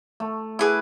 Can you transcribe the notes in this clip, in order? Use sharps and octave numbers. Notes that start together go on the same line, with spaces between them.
A3
E4 G#4 B4 D6